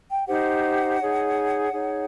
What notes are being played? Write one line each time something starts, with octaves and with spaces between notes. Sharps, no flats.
G5
D#4 G4 C5 F#5
D#4 G#4 C#5
D#4 G#4 C#5